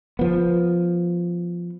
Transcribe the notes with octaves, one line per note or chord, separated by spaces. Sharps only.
F3 B3